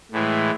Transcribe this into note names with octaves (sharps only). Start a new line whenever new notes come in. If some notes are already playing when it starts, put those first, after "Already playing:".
A2 E3 G#3